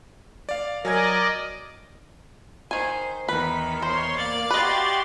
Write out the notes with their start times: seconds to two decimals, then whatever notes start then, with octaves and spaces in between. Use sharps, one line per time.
0.49 D5 F5
0.85 F#3 A#4 D5 D#5 G#5 G#6
2.71 D#3 C5 G#5
3.29 E2 D#3 B4 B5
3.82 C5 C#5 C6
4.15 A#3 D5 F5 A6
4.50 F#4 G4 B4 D#5 C6